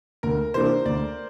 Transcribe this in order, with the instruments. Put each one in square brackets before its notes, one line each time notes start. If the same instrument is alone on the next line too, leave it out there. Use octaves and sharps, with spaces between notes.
[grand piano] D2 [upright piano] A#4
[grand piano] C3 E3 A#3 D4 [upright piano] C5
[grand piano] D2 [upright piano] D5